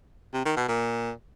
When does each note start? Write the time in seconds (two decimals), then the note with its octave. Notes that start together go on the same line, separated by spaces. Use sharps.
0.33 C3
0.45 D#3
0.57 B2
0.68 A#2